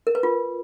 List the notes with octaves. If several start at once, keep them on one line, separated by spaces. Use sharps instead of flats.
A#4
B4
F4